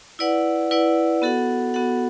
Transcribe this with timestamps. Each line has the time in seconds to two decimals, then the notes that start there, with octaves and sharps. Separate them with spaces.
0.19 E4 B4 D5 F#5
0.71 E4 B4 D5 F#5
1.22 B3 F#4 A4 F#5
1.74 B3 F#4 A4 F#5